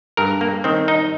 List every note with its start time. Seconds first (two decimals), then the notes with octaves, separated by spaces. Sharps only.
0.17 G2 A#4
0.41 A#3
0.64 D#3 C4
0.88 D#4